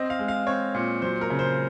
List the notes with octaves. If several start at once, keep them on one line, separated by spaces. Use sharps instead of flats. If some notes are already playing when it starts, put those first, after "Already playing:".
Already playing: C4 D#5
F5
G#3
F5
C4 C#5
A#2
F#3 C5
A#4
C#3
C5